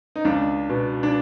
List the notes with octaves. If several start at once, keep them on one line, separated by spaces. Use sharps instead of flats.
D#4
C#2 D4
B2
D4